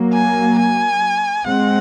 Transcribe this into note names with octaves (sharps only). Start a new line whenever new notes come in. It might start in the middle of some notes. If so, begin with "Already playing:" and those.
Already playing: F#3 A#3
G#5
G#5
G#3 C4 F#5